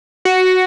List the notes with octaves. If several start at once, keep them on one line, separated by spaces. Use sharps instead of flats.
F#4